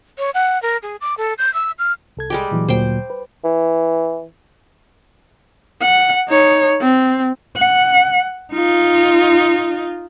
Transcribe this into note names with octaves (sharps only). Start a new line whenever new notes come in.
C#5
F#5
A#4
G#4
D6
A4
G6
E6
F6
C2 A4 G#6
G3 G#3 G4
A#2 E3 F#3
D2 A#2 F#3 C5 G5
B4
E3
F#5
D#4 C#5
C4
F#5
D#4 F4